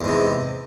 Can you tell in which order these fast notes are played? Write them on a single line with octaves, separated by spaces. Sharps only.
E2 G#2 C3